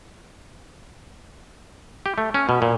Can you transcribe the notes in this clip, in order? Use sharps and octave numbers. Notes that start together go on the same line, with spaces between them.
G4
A3
C#4
B2
A#2